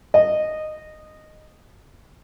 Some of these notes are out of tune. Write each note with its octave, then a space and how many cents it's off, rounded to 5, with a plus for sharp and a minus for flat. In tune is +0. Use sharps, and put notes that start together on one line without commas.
D#5 -10